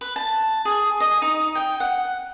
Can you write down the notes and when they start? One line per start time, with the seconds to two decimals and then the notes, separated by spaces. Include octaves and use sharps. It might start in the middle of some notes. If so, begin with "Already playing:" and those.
0.01 B4
0.16 A5
0.65 G#4
1.00 D#5
1.22 D#4
1.55 G5
1.80 F#5